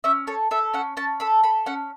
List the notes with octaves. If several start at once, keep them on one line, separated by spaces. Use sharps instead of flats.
C#4 E5
A4 C#5
A4 E5
C#4 F#5
C#4 A5
A4 B5
A4 B5
C#4 F#5